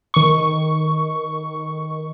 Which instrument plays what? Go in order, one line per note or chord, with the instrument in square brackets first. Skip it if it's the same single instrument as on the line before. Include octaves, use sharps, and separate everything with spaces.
[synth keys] D#3 C#6